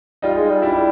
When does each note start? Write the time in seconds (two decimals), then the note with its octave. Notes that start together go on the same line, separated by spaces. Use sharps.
0.22 G3 D#4 F4
0.36 G#3
0.49 G3
0.62 D4 E4